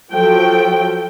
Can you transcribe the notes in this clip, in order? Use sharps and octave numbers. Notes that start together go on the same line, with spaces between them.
F3 F#3 A4 G5